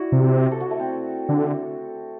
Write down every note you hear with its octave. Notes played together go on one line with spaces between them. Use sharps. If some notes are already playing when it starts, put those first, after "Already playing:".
Already playing: E4 F#4 D5
C3
A4
F#4
A3
C4
D3